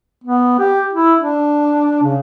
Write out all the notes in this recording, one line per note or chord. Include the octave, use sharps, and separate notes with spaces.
B3
G4
E4
D4
C#3